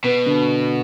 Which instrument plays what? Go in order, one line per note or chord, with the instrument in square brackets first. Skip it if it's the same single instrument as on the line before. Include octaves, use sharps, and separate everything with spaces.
[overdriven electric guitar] B2 [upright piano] B3
[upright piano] D3